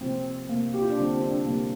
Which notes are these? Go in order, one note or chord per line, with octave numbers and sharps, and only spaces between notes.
C3 F3 A#3 C4
C3 A#3
G4
F4
D4
D3 G3 A#3 C4
C4
D4
C3 G3 A#3